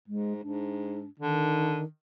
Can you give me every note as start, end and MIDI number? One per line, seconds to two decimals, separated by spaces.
0.08 0.40 44
0.08 0.33 56
0.43 1.04 44
0.43 1.08 62
1.20 1.83 50
1.20 1.84 51